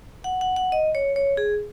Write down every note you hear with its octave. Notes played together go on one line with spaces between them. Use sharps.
F#5
F#5
F#5
D#5
C#5
C#5
G#4